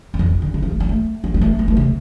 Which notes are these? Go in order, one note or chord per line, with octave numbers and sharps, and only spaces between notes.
G2
F2
E3
D3
E3
F3
A3
G3
A3
G3
G3
A3
B3
A3
C3